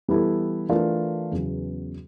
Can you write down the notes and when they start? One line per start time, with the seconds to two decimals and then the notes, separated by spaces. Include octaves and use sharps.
0.08 E3 G3 B3 E4 A4
0.69 E3 A3 D4 F4 A#4
1.32 E2 C#3 F#3 B3